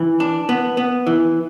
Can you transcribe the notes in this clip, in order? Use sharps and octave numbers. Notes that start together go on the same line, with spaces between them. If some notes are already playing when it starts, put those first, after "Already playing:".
Already playing: E3
D4
B3
B3
E3